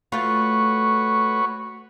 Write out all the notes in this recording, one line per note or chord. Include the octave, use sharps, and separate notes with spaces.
A3 F4 F#4 B4 C#5